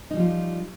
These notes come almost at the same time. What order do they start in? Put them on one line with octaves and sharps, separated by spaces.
D#4 G3 F3 F4